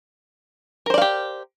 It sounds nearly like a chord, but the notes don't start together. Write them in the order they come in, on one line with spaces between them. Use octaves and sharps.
A#4 C5 D5 F5 G4